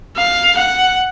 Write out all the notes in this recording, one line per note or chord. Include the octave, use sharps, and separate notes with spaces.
F5
F#5